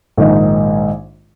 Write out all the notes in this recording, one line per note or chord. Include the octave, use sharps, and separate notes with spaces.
A#1 G#2 D#3 G#3 D#4